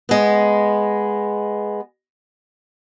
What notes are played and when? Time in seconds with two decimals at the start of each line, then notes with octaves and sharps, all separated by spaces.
0.09 G#3 B3